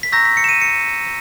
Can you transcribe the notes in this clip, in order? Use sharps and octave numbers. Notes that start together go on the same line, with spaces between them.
B6
A#5 C#6 E6 G6 A#6
B6
C#7
E7
D#7
C#7